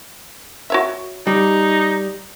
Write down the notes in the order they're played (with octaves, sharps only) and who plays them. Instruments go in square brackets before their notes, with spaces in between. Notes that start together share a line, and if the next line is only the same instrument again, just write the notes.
[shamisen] F#4 C#5 E5
[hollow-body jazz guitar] G3 [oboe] D#4